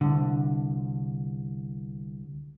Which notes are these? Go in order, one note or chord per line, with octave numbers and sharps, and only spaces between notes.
C2 D3